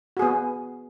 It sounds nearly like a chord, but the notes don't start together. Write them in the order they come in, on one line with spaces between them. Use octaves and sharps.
F#4 G#4 B3